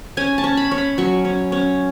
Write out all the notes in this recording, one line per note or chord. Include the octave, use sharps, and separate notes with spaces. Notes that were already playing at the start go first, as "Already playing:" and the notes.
C#4 G#5
A5
C#4
B5
C#4
B5
F#3 C#6
C#4
C#4